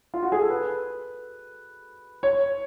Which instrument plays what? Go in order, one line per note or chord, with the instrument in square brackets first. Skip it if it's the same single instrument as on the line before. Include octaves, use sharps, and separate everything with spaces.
[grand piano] F4
F#4
G#4
A4
B4
C#5